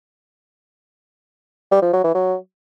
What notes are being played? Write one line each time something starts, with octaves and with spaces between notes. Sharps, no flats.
G3
F3
F#3
E3
F#3